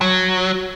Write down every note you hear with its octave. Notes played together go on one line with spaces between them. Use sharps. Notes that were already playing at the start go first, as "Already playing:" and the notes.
F#3